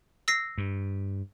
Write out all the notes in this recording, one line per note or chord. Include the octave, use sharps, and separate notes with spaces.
E6 A#6 C7
G2